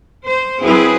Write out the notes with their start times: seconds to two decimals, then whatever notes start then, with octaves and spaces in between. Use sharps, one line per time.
0.24 C5
0.60 F#3 C4 E4 G#4 B4